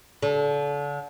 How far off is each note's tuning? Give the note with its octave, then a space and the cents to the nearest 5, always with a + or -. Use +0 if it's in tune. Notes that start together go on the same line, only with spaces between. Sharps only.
D3 -30